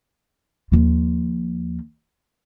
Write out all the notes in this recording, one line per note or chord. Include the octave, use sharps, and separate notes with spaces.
D#2 F3